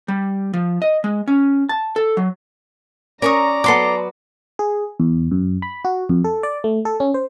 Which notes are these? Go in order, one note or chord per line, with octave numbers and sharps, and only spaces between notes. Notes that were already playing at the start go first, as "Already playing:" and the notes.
G3
F3
D#5
G#3
C#4
A5
A4
F#3
C#4 A#4 D5 A#5 C#6 D#6
F#3 B3 A4 C6 D6
G#4
E2
F#2
B5
F#4
F2
A4
D5
A3
A4
C#4
C5